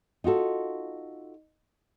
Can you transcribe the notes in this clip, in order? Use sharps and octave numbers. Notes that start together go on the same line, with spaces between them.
D#4 F4 F#4 A4